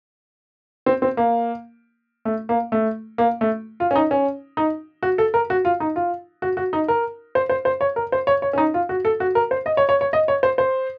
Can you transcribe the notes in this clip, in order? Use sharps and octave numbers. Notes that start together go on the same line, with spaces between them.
C4
C4
A#3
A3
A#3
A3
A#3
A3
F4
C#4
D#4
C#4
D#4
F#4
A4
A#4
F#4
F4
D#4
F4
F#4
F#4
D#4
A#4
C5
C5
C5
C#5
A#4
C5
C#5
C#5
C#4
D#4
F4
F#4
A4
F#4
A#4
C5
D#5
C#5
C#5
C#5
D#5
C#5
C5
C5